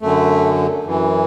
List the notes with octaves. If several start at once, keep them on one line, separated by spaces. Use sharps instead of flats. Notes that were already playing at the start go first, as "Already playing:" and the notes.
F#2 D3 A3
F#2 E3